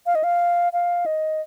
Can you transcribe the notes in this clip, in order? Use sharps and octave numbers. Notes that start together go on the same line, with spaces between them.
F5
D#5
F5
F5
D#5